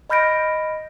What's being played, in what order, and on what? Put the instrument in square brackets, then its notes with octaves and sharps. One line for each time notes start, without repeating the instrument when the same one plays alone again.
[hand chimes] D#5 B5 F6 G6 A#6 D7